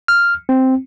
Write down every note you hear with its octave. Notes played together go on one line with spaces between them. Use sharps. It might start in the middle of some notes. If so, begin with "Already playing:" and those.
F6
C4